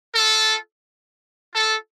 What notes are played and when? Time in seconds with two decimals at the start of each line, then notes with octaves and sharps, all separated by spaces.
0.15 F4 A4
1.54 F4 A4